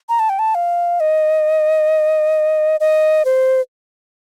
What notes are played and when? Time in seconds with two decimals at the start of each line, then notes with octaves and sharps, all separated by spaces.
0.09 A#5
0.19 A5
0.29 G5
0.39 A5
0.55 F5
1.00 D#5
2.80 D#5
3.25 C5